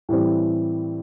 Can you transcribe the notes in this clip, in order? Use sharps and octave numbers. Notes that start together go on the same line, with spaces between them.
A2 E3 G3 C4